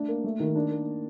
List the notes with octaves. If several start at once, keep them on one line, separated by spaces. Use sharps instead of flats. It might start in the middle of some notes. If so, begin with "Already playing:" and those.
Already playing: A3 D4
A#3
A3
D#3
D4
A#3